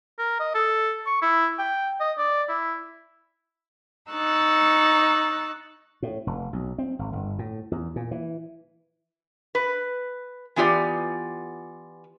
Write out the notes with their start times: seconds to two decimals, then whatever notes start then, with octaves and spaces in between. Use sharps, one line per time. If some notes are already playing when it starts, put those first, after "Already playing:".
0.19 A#4
0.40 D#5
0.55 A4
1.06 C#6
1.22 E4
1.59 G5
2.00 D#5
2.18 D5
2.49 E4
4.10 D#4 C#6 E6 F#6 A6
6.02 A2
6.27 F1
6.53 B1
6.78 C4
6.99 G#1
7.13 G1
7.39 A2
7.72 E2
7.96 A#2
8.11 E3
9.55 B4
10.56 E3 B3 F4 G4 D5